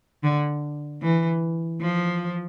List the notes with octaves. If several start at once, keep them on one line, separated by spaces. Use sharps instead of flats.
D3
E3
F3